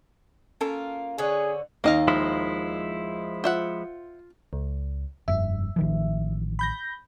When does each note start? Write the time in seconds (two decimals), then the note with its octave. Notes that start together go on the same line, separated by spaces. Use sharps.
0.61 A#3 C#4 F4 A4 A#4 A5
1.18 D3 G#4 C#5 F#5
1.84 D#2 A#3 D#4 D#5 F5
2.08 F3 G#3 E4
3.44 F4 C5 E5 F#5
4.53 C#2
5.28 F1 G2 E5
5.76 A1 D#3 F3
6.59 B5 G6 A#6